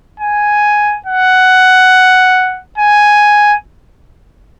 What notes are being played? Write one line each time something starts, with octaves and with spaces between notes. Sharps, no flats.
G#5
F#5
G#5